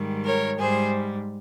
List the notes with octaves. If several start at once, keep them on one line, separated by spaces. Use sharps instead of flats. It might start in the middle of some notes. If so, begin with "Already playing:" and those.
Already playing: G#2 D#3 G3
A#4 C#5
G#2 G3 G#4 C5